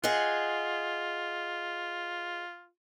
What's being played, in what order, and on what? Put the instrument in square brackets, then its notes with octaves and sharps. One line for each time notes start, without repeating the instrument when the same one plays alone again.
[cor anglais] F4 [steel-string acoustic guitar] G#4 D#5 F#5